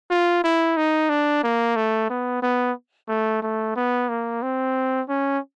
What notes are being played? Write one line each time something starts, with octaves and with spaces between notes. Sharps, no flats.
F4
E4
D#4
D4
A#3
A3
B3
B3
A3
A3
B3
A#3
C4
C#4